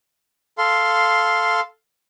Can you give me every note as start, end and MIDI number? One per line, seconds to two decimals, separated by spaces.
0.58 1.60 69
0.58 1.60 77
0.58 1.60 84